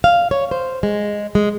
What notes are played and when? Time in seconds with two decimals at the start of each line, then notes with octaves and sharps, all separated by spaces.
0.04 F5
0.31 C#5
0.51 C5
0.83 G#3
1.35 G#3